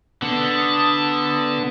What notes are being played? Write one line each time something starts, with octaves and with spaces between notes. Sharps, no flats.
D3 B3 A5